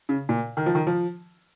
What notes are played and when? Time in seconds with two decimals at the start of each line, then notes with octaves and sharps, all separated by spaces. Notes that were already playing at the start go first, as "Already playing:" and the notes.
0.09 C#3
0.29 A#2
0.57 D#3
0.66 F3
0.75 D#3
0.87 F3